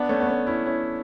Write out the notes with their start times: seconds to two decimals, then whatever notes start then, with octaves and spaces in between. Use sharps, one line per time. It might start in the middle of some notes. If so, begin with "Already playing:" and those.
Already playing: B3 D4
0.09 A3 C#4
0.20 B3
0.28 A3 C#4
0.46 C#4 E4
0.66 C#4 E4